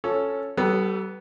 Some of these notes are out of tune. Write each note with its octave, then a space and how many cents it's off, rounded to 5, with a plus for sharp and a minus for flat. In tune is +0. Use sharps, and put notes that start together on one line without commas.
C#4 +0 F4 +20 A4 +0
G3 -35 B3 +0 A4 +0